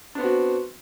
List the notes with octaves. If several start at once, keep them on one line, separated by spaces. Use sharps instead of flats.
B3 C4 D4 F#4